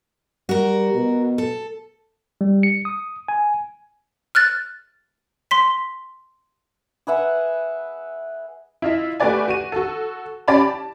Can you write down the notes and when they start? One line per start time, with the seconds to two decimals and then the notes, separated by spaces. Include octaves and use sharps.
0.49 G3 F#4 A#4
0.94 B2
1.38 A4
2.41 G3
2.63 C#7
2.85 D#6
3.28 G#5
4.35 F6 F#6 A6
5.51 C6 B6
7.07 G#4 B4 E5 F#5
8.82 E4 F4 D#5 E5
9.20 A3 F#4 G4 B4 D5 G#5
9.48 F#4 D#7
9.72 F#4 A4
10.48 C#4 G4 D5 A5 B5
10.60 A5